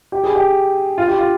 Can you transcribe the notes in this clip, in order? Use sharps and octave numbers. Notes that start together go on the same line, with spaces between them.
G4
G#4
G4
F4
G4
F4